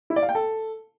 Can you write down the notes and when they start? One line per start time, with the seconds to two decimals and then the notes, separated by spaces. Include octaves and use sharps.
0.10 E4
0.16 D5
0.22 F5
0.29 G5
0.35 A4